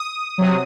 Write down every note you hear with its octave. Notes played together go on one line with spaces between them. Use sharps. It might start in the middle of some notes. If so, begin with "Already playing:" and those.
Already playing: D#6
C3 F#3